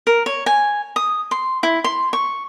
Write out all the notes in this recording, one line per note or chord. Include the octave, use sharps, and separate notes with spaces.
A#4
C#5
G#5
D#6
C6
E4
C6
C#6